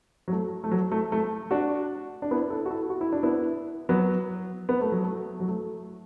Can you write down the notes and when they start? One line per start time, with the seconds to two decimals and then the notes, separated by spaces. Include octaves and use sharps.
0.28 F#3
0.32 A3
0.64 A3
0.71 F#3
0.92 A3
1.12 A3
1.51 D4 F#4
2.22 D4
2.31 B3 E4
2.50 E4 A4
2.66 F#4
2.71 E4 A4
2.90 F#4
3.01 E4
3.12 D4
3.23 B3 E4
3.89 F#3 B3
4.69 B3
4.81 A3
4.92 F#3
5.03 A3
5.40 F#3
5.48 A3